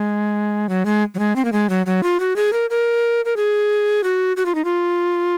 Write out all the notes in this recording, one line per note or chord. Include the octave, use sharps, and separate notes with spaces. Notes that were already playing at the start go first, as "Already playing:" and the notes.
Already playing: G#3
F#3
G#3
F#3
G#3
C4
A#3
G#3
F#3
F#3
F4
F#4
G#4
A#4
A#4
A#4
G#4
F#4
F#4
F4
D#4
F4